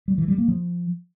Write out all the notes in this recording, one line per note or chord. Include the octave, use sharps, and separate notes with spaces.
G3
E3
G3
A#3
F3